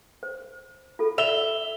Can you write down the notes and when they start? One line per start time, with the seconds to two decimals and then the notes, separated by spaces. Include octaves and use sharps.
0.23 C5
0.99 F4 A4
1.18 E5 F7 G7